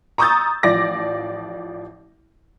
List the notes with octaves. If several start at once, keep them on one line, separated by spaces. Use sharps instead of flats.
A#5 C#6 D#6 E6 G6 A6
A1 F3 D5 D6 A#6